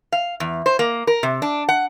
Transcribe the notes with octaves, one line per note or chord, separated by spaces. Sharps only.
F5
E2
C5
A#3
A#4
C3
D4
F#5